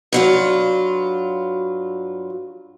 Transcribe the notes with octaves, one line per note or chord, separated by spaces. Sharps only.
G2 F#3 F4